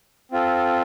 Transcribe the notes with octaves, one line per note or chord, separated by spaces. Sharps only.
C4 F4 A4